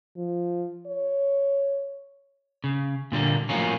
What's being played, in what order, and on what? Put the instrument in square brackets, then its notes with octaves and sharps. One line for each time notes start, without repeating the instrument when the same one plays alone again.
[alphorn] F3
C#5
[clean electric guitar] C#3
A#2 D3 G3 A#3
A2 F3 F#3 A#3 C#4